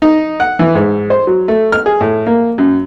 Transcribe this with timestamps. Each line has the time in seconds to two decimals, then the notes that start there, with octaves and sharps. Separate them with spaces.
0.02 D#4
0.40 F#5
0.59 E3
0.75 G#2
1.10 C5
1.27 F#3
1.48 A3
1.72 F6
1.86 G#4
2.01 A2
2.27 A#3
2.58 F#2